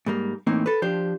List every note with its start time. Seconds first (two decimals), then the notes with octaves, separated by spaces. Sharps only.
0.06 G#2 G3 A#3
0.47 A2 E3 A#3 C4 D#4
0.66 A4 B4
0.82 F3 D4 G4 C5